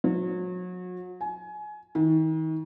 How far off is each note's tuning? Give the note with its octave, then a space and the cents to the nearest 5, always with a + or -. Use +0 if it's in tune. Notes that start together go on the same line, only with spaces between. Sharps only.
F#3 -35
G#5 +25
D#3 +40